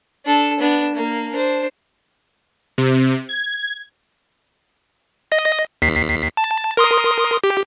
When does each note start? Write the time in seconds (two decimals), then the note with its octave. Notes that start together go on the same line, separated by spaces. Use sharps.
0.25 D4 A4
0.60 B3 D4
0.94 A#3
1.31 D4 C5
2.78 C3
3.29 G#6
5.32 D#5 A#6
5.82 D#2 B6 C7
6.37 A5
6.77 A#4 C6 D#6
7.44 G4